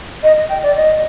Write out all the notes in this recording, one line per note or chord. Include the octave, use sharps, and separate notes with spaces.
D#5
D#5
G5
D5
D#5